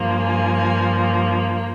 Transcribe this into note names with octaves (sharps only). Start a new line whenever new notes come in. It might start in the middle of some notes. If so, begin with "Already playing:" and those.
Already playing: G2 F3 A#3
G#5